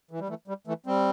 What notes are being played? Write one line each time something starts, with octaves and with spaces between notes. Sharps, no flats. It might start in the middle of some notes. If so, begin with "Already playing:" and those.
E3
G3
E3 A3
G3
E3 A3
G3 C4